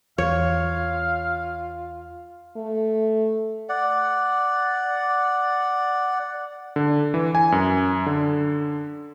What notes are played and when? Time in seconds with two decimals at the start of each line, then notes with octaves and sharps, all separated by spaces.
0.18 E2 F4 C#5 F5
2.56 A3
3.69 D5 F#5
6.76 D3
7.14 E3
7.35 G#5
7.52 F#2
8.06 D3